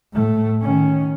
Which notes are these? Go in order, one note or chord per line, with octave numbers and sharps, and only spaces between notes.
A2 A3
D#3 C#4